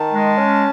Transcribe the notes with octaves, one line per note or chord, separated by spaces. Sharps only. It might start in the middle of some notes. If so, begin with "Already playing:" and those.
Already playing: D#3 A5
G#3
C#4